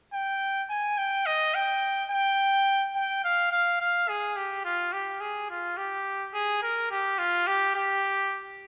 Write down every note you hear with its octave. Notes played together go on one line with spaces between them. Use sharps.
G5
G#5
G5
D#5
G5
G5
G5
F5
F5
F5
G#4
G4
F4
G4
G#4
F4
G4
G#4
A#4
G4
F4
G4
G4